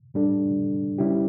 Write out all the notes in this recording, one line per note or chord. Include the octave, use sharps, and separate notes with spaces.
A2 G3 D4 A4
C#3 G3 C#4 E4 G4